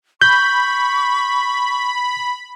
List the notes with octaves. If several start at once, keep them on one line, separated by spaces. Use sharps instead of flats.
B5 C#6 G6